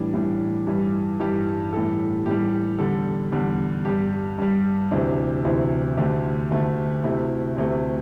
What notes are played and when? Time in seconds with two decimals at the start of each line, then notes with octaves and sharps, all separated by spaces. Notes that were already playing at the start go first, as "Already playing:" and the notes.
Already playing: A2 E3 G3 D4
0.14 A2 E3 G3
0.67 G2 E3 G3
1.20 G2 E3 G3 G4
1.73 A2 E3 G3 A4
2.26 A2 E3 G3 G4
2.79 E2 D3 G3 A4
3.32 E2 D3 G3
3.85 G2 G3 G4
4.38 G2 G3
4.91 D2 C3 E3 D4
5.45 D2 C3 E3 E4
5.97 D2 D3 A3 G4
6.51 D2 D3 A3
7.04 D2 C3 A3 E4
7.56 D2 C3 A3